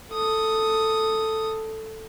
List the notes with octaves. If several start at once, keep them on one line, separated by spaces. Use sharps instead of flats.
A4 D#6